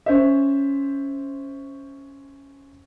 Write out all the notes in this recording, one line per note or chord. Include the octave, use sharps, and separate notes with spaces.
C#4 C5 E5